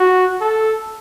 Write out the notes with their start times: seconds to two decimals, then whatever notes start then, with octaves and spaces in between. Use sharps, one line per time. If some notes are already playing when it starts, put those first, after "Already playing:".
Already playing: F#4
0.41 A4